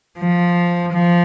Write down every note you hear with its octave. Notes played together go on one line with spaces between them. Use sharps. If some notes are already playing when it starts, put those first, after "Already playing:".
F3
F3